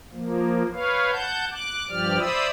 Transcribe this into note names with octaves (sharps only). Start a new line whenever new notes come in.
F3 A#3
B4 C#5 F5
F#5 A5 G6
D6 F#6
G2 F3 G4 D5 F6
C5 D5 E5 B5 D#6 E6